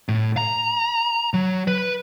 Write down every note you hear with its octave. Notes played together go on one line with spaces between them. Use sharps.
A2
A#5
F#3
B4